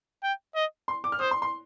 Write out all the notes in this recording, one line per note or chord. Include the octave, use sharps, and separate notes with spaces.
G5
D#5
C6
D6
F6
C5 D#6
C6
C6